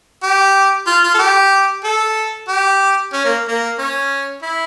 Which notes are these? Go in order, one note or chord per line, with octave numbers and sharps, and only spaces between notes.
G4
F4
F4
A4
G4
A4
G4
C#4
A#3
A#3
C#4
E4